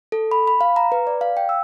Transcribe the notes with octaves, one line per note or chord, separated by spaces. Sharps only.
A4
B5
B5
F5
A#5
B4
D5
F5
G5
E6